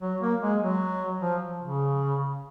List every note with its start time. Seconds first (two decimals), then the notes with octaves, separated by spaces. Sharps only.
0.01 F#3
0.20 A#3
0.41 G#3
0.61 F#3
1.20 F3
1.61 C#3